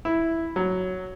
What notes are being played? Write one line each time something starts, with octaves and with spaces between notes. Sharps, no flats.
E4
F#3